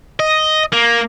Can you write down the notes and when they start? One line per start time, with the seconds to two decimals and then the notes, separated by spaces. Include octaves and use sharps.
0.20 D#5
0.73 A#3